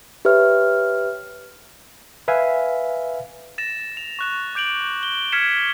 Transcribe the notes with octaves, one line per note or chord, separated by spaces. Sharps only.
G4 B4 C#5 E5 F6
B4 E5 F5 G#5
A6 A#6 E7
F7
C#6 F#6 E7
D6 G6 D7 F7 F#7
G7
F6 F#6 G#6 B6 C#7 E7